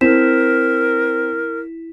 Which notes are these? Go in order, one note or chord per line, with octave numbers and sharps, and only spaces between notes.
C4 E4 A#4 B6 E7